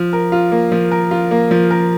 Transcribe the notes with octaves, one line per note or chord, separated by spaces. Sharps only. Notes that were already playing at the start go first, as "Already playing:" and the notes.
Already playing: F3
A#4
F4
A#3
F3
A#4
F4
A#3
F3
A#4